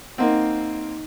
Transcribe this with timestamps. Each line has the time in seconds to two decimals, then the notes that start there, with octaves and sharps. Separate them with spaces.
0.18 A#3 C4 D#4 D#5 F#5